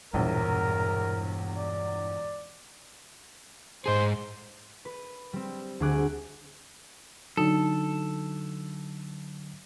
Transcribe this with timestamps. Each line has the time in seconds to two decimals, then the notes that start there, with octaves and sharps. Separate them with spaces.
0.13 E1 A#1 E2 G2 A#4
1.56 D5
3.86 G#2 G#4 C5
4.85 B4
5.33 G3 C4
5.80 D2 G#4 D6 F#6
7.37 D3 F#3 D#4 A4